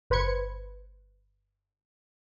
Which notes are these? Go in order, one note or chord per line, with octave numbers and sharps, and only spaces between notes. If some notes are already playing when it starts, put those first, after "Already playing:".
G1 B4 C5 B5 G#6 C#7